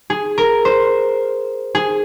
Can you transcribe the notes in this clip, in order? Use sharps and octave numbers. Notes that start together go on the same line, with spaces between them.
G#4
A#4
C5
G#4